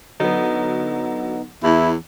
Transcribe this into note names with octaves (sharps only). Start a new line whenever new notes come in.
D3 F#3 B3 D#4
E2 E4